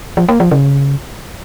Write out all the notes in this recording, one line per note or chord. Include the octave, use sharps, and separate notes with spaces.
F3
A#3
F3
C#3